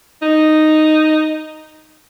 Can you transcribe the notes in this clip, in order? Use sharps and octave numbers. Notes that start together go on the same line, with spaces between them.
D#4